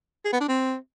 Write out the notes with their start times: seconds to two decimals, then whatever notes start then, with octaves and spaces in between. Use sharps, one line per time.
0.25 G#4
0.33 B3
0.41 D4
0.48 C4